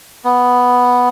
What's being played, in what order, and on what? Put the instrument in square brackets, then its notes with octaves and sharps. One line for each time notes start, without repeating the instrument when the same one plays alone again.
[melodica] B3